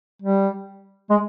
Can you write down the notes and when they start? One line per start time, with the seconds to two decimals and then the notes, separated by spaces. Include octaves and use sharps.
0.22 G3
1.10 G#3